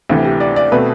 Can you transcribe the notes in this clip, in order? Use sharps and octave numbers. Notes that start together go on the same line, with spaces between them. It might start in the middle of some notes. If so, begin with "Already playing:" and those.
D2 C3 E3 G4
G4
D5
D5
B2 A3 C4 B4